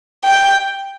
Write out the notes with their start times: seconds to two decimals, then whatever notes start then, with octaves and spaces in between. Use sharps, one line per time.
0.25 G5